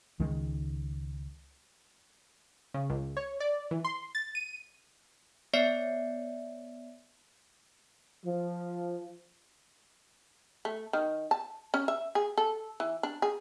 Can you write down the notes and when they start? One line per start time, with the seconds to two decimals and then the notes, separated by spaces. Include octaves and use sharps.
0.20 C#2 D#3 G#3
2.74 C#3
2.90 C#2
3.17 C#5
3.40 D5
3.71 E3
3.85 C6
4.15 A6
4.35 D#7
5.53 B3 C#5 D5 E5 C7 C#7
8.26 F3
10.65 A3
10.93 D#3
11.31 A5
11.74 C#4
11.88 E5
12.15 G#4
12.38 A4
12.80 E3
13.03 D4
13.22 G#4